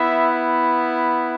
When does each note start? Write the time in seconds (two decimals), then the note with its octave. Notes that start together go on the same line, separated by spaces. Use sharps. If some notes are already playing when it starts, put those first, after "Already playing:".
Already playing: B3 E4 E5